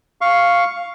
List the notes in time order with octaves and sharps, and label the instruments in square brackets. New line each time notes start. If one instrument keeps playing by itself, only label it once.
[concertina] F5 C#6